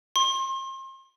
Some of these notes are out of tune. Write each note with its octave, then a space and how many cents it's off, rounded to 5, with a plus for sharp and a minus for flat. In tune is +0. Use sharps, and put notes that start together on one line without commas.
C6 +35